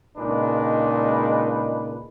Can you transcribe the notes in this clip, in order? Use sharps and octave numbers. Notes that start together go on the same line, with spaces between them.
C#2 A#2 G#3 D4 D#4 B4